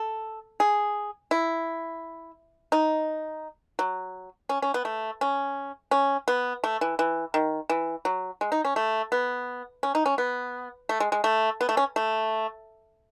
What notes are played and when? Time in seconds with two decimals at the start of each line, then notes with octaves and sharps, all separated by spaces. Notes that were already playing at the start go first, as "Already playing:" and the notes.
Already playing: A4
0.60 G#4
1.31 E4
2.72 D#4
3.79 F#3
4.49 C#4
4.62 C#4
4.74 B3
4.85 A3
5.21 C#4
5.91 C#4
6.28 B3
6.64 A3
6.81 E3
6.99 E3
7.34 D#3
7.69 E3
8.05 F#3
8.41 G#3
8.52 D#4
8.65 C#4
8.76 A3
9.12 B3
9.83 C#4
9.95 D#4
10.06 C#4
10.18 B3
10.89 A3
11.00 G#3
11.12 G#3
11.24 A3
11.61 B3
11.69 A3
11.77 C#4
11.96 A3